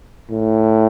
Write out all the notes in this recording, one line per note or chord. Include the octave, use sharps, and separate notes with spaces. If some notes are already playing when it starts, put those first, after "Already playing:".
A2